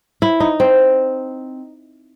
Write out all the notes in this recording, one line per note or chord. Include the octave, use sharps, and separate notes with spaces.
E4
D#4
C4